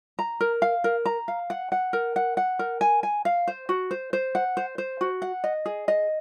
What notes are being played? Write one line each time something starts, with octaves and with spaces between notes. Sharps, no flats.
A#5
A#4
F5
A#4
A#5
F5
F#5
F#5
A#4
F#5
F#5
A#4
G#5
G#5
F5
C5
F#4
C5
C5
F#5
C5
C5
F#4
F#5
D#5
G#4
D#5